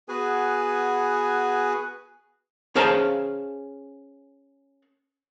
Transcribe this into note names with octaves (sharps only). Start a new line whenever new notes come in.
B3 F#4 G#4 B4 G#5
C#4 G#4 C5 F5 A5 A#5